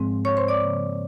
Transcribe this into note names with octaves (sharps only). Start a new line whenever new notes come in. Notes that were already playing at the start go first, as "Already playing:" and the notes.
Already playing: G#2 F3 G#3 C4
C#5 C#6
C5 C6
D5 D6
C#3 F3 A#3